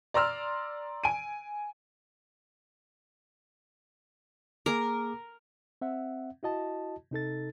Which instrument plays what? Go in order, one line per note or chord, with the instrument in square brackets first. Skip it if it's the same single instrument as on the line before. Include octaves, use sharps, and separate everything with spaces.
[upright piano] D5 A#5 C6 E6 F6
G#5 D7 D#7
[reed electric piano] A#3 G#4 D6 [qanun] A#4 A#5
[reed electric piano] C4 E5 F#5
E4 F#4 D#5 A5
C3 D#4 A4 A6